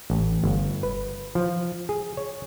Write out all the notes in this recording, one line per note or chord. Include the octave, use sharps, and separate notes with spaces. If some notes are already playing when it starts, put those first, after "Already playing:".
A1
G1
B4
F3
G#4
C#5